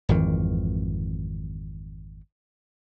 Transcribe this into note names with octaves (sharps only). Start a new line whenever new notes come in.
G#1 F2 D#3 E3